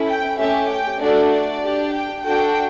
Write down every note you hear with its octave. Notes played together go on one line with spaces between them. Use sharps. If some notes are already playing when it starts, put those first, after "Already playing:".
Already playing: C#4 E4 A4
G5
A3 C#4 G4 E5
G5
A3 D4 F#4 A4 D5
D5
D4 G4
G5
D4 F#4 A4 G5